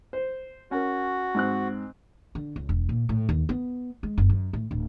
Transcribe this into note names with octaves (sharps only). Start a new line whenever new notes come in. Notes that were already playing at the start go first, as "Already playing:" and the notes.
C5
C#4 F#4 A#4
G#2 C4 F#6
D3
C#2
E1
A#2
A2
D#2
B3
G#3
F#1
F#2
A2
D1